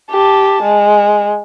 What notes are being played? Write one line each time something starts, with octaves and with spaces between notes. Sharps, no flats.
G4 A5
G#3